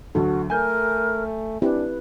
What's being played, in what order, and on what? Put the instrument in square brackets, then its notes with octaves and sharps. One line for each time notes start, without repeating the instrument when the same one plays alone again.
[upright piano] D2 F#3 [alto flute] F#4 [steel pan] A4
[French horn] A3 [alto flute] A#4 [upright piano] G#5 G6
[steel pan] C4 E4 G4 [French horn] D4 [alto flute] B4